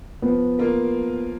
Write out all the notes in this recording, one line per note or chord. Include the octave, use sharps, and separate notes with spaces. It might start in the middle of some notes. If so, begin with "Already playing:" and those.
F3 B3
A#3 F4 A#4